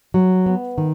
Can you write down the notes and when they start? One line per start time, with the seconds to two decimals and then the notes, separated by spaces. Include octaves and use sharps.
0.14 F#3
0.46 B3
0.78 D#3